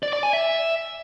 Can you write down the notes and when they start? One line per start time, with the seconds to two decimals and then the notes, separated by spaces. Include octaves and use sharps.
0.03 D5
0.13 D5
0.23 G#5
0.33 E5